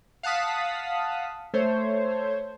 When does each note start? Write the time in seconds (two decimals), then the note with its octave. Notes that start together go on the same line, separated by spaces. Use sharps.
0.23 F5 F#5 A5 D#6 B6
1.54 A3 C5 C#5